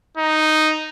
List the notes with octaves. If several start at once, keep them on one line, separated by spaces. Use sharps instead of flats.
D#4